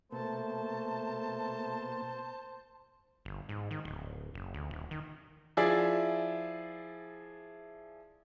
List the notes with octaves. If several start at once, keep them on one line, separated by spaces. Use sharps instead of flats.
B2 A3 A#3 C5 A5
G1
G#2
D#3
D1
F#1
D2
D#1
D#3
F3 E4 G#4 D5 E5